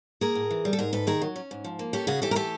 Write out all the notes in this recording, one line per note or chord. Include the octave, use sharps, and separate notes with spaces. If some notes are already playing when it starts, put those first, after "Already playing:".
A#3 G#4 A#4
A2
E3
G3
A4
G#2 G#4 A#4
G#2 A4 B4
D#3 G#4 A#4
F#3
C#4
G#2
F3
A#3
C#4 G4 A4
C#3 F#4 G#4
E3 G4 A4
A#4
A3 G4 A4